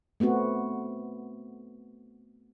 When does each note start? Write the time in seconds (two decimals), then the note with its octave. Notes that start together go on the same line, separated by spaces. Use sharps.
0.20 A3 B3 C4 F#4